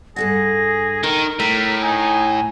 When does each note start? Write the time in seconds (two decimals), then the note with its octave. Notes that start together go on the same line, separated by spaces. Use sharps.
0.16 G2 G#4 A4 F#5 A#6
1.04 D#3 D#4 A#4
1.40 A2 A#5 B6
1.82 D#4 G#5